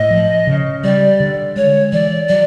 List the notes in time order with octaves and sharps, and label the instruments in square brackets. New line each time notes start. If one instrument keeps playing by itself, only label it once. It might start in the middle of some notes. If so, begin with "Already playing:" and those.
Already playing: [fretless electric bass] A2 [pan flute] D#5
[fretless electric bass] F3
C#3
[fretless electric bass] G3 [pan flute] D5
[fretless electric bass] D3
[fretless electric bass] G#3 [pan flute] C#5
[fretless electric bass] E3 [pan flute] D5
[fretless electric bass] F#3 [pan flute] D5